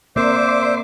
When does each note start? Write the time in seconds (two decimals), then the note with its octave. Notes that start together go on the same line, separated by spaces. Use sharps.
0.16 A#3 C4 A#4 C5 D5 E5 C6 D6